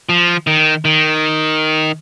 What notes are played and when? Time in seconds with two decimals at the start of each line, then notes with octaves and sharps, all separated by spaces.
0.09 F3
0.47 D#3
0.85 D#3